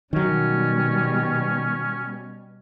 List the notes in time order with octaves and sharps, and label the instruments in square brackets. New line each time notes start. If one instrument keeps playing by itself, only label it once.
[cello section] B2 G3 [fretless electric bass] D#3 F#3 [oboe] C#4